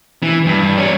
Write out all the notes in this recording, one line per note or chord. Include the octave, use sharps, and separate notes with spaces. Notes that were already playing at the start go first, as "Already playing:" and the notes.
E3
G2
G3 C#5